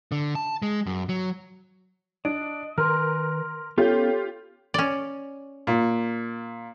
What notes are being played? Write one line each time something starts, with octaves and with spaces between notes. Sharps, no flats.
D3
A5
G#3
F#2
F#3
D4 D#5 D7
D#3 A#4 B4 G#5 C6 F6
B3 C#4 F4 G4 A4 C#5 G5
C#4 D5
A#2